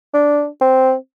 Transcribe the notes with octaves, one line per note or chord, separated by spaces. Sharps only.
D4
C4